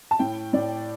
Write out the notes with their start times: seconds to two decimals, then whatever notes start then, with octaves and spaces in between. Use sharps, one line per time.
0.11 A5
0.19 A2 G5
0.53 A2 D5